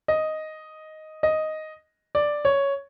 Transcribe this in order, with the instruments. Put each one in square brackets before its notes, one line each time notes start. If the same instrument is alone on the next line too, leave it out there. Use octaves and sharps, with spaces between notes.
[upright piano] D#5
D#5
D5
C#5